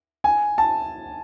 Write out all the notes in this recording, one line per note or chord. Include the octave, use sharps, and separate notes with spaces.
G#5
A5